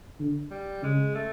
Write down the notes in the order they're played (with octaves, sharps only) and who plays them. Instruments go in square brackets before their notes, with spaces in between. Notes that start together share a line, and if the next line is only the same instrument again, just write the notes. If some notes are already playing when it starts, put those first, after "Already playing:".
[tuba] D3
[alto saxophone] G3
[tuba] C#3 [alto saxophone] G#3
[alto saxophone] A3